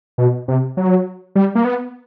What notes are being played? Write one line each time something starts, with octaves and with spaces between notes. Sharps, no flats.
B2
C3
F#3
G3
A#3
B3